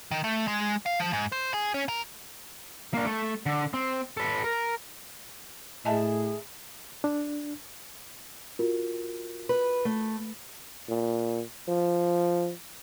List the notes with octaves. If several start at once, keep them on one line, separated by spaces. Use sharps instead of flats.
D#3
A3
G#3
F5
F3
G#2
C5
G#4
C#4
A#4
A#3 D4
A3
D3
C4
A4 B4
A#4
A2 G#4 A4 D#5 E5 G#5 A5 B5
D4
F4 F#4 A#4
B4
A3
A#2
F3